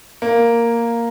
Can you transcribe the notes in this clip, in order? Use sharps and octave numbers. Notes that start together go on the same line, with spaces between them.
A#3